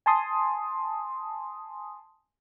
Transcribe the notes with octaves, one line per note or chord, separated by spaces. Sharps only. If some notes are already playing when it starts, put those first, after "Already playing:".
G#5 A5 C6 D#6